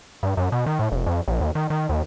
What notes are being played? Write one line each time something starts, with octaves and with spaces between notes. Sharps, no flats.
G2
F#2
B2
D#3
A2
F1
F2
A#1
D#2
D#3
D#3
D#2